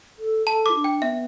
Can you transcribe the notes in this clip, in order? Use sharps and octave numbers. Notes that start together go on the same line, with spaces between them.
A4
A4 A5
E4 D6
D4
G5
B3 E5